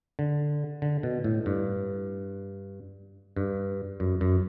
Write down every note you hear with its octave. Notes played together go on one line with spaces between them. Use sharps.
D3
D3
B2
A2
G2
G2
F#2
F#2